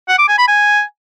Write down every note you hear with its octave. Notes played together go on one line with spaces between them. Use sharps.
F#5
D6
G#5
B5
G#5